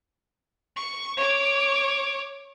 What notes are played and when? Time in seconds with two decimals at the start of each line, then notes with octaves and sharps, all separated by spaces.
0.76 C#6
1.17 C#5 D6